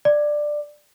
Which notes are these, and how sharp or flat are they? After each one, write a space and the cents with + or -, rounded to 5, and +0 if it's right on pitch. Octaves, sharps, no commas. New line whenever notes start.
D5 +10